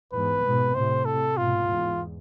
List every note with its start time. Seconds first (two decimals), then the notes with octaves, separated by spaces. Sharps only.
0.13 E2 G#2 B4
0.45 G#2 B2
0.75 A2 C3 C5
1.05 A4
1.37 G#2 B2 F4
1.67 E2 G#2